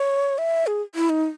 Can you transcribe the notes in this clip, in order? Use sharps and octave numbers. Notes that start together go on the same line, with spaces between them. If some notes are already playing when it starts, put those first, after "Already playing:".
Already playing: C#5
E5
G#4
E4
D#4